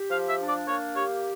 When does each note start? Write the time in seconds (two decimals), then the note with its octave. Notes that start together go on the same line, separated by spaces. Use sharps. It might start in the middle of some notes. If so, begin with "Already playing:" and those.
Already playing: G4
0.10 F3 F5
0.29 E5
0.39 D4
0.48 D5
0.67 A#3 C#5
0.96 G4 C#5